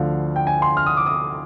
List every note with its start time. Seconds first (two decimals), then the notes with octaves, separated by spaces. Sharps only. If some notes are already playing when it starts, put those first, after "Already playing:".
Already playing: D2 D3 F3 F5
0.36 G5
0.47 G#5
0.62 C6
0.77 F6
0.86 D#6
0.97 D6
1.06 D#6